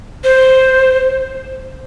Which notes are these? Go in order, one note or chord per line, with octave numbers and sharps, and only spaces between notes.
C5